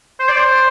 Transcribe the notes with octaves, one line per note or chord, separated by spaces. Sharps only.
C5
D5
C5